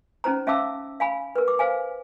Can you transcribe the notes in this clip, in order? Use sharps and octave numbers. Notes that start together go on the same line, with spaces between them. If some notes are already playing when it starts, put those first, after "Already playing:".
C#4 D#4 C5 A#5
C#4 E5 F5 A5 D6 E6
F5 G#5 B5
A#4 B4
D6
C5 F5 G#5